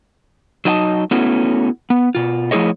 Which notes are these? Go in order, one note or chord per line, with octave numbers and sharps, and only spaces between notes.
F#3 D#4 D#5 G5 A5
A3 B3 C#4 E4 F#4
B3
B2 F4
F3 A3 E4 G#4 C#5 D#5